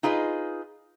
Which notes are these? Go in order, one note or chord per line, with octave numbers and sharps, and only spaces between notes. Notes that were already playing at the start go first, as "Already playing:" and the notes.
D#4 F4 G#4 B4 D#5